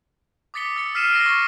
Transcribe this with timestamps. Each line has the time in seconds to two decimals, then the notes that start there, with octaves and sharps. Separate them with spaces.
0.54 D6 D#6 A6 B6 C#7 G7
0.76 E6 A6 C#7
0.95 E6 F6 B6 C7 D#7 E7
1.12 A#6 C7 D7
1.26 C#6 A6